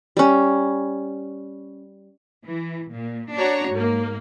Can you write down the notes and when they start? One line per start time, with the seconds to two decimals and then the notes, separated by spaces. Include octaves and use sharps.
0.17 G3 C#4
2.45 E3
2.93 A#2
3.34 D4 F#4 C#5 A#5
3.71 G#2 A#3